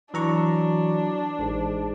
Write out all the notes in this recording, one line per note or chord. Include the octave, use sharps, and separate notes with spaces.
E3 F#3 D4 A#5 C#6
A1 G#2